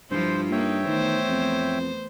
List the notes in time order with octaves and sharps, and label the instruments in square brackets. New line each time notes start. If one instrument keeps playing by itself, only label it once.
[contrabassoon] G2 [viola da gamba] F3 E4 F4 [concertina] C5
[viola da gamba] A#3 D#4 [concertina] C#5 E5 G5
[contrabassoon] D#3 [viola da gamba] E3 A3 B3 [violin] C5
[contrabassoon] F2